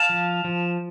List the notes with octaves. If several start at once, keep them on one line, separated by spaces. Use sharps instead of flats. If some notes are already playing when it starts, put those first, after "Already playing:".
Already playing: F5 A5
F3
F3